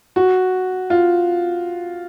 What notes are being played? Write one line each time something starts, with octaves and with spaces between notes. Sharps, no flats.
F#4
F4